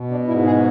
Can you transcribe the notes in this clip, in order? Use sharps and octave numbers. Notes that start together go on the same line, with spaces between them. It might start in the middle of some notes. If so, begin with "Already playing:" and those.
Already playing: B2
D4
G#2 E4
G#4